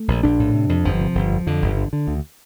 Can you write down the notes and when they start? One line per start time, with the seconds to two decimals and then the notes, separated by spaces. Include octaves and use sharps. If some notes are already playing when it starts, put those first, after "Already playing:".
Already playing: A3
0.08 A#1
0.23 A#1 D4
0.39 A2
0.54 C3
0.69 F2
0.84 G1 F3
1.00 C3
1.15 G1
1.31 F2
1.47 F2 D3
1.62 G1
1.77 D3
1.93 D3
2.07 D2